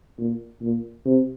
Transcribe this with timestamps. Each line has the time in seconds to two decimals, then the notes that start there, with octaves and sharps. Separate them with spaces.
0.19 A#2
0.62 A#2
1.06 C3